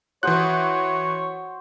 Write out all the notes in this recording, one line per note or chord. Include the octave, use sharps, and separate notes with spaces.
E3 F#4 C5 C#5 D#6 F#6